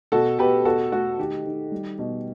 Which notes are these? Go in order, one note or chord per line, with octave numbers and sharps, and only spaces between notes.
B2 F#4 A4
B2 G4 B4
B2 F#4 A4
A3 F#4
D#3 G4
D#3
G3
B2